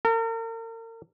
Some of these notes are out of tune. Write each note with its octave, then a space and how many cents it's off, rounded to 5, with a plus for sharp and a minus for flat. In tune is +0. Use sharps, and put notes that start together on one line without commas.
A#4 -40